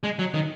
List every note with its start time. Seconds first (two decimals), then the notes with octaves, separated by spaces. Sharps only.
0.04 G#3
0.19 F#3
0.34 D#3